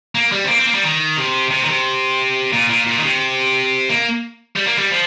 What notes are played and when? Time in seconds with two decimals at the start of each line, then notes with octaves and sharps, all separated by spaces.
0.15 A#3
0.32 G3
0.44 C4
0.49 A#3
0.57 C4
0.66 A#3
0.74 G3
0.83 D#3
1.17 C3
1.50 C3
1.63 D#3
1.68 C3
2.53 A#2
2.70 A#2
2.87 A#2
2.97 D#3
3.04 C3
3.89 A#3
4.56 G3
4.67 A#3
4.78 G3
4.91 F3